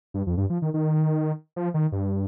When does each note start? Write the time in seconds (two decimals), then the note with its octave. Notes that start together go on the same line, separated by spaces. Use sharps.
0.14 G2
0.27 F2
0.37 G2
0.50 F3
0.62 D#3
0.74 D#3
1.56 F3
1.74 D#3
1.92 G2